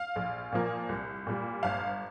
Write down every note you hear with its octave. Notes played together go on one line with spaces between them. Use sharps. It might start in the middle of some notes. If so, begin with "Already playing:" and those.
Already playing: F5
A#1
A#2 F3 A#3
C2
A#2 G3
G1 F5